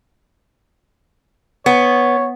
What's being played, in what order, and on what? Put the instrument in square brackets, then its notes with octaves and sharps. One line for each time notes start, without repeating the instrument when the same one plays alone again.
[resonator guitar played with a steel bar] B3 [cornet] C#5